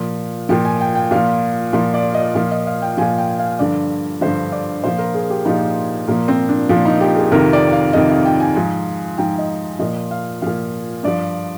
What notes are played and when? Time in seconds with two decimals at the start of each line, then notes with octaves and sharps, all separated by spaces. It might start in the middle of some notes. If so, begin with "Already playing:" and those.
Already playing: A#2 F3
0.49 A#2 F3 G5
0.65 G#5
0.81 G5
0.95 G5
1.11 A#2 F3 F5
1.73 A#2 F3
1.94 D5
2.14 D#5
2.35 A#2 F3 F5
2.51 D#5
2.67 F5
2.82 G5
2.97 A#2 F3 G#5
3.18 G5
3.39 F5
3.59 G2 D3 F3 D5
4.21 G2 D3 F3 C5
4.52 D5
4.84 A#2 F3 C5
4.99 A#4
5.14 G#4
5.30 G4
5.45 A#2 F3 D#4
6.07 A#2 F3 A#3
6.28 C4
6.49 D4
6.69 A#2 F3
6.85 D#4
7.01 G4
7.16 G#4
7.31 F2 C3 D#3 A#4
7.53 D5
7.73 F5
7.93 F2 C3 D#3 D#5
8.10 F5
8.25 G5
8.40 G#5
8.55 G#2 F3 G#5
9.18 G#2 F3 G5
9.38 D#5
9.79 A#2 F3 D#5
10.11 F5
10.42 A#2 F3 F5
11.03 G2 F3 D5